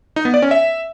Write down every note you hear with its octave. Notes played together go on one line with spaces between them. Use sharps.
D#4
B3
D5
C#4
E5